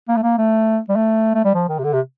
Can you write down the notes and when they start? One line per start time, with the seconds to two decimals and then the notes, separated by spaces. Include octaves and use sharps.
0.08 A#3
0.17 A3
0.23 A#3
0.38 A3
0.89 G3
0.96 A3
1.35 A3
1.45 G3
1.54 F3
1.69 D#3
1.79 C3
1.84 D3
1.93 C3